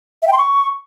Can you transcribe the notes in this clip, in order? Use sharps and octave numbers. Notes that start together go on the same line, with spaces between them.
E5
G5
C6
C#6